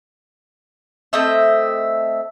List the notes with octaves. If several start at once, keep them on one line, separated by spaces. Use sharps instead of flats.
A3 C4 D#5 E5